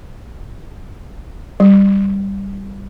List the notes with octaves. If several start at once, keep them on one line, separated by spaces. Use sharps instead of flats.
G3